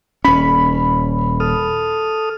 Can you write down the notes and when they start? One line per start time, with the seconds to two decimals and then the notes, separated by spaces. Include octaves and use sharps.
0.25 D#1 C#4 B5
1.40 A4 D#6 F6